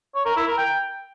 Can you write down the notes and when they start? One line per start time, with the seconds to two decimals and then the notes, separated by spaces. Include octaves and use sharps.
0.15 C#5
0.25 A#4
0.36 E4
0.47 A#4
0.58 G5